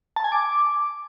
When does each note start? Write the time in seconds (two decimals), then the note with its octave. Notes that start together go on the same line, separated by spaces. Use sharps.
0.16 A5
0.24 G#5
0.32 D6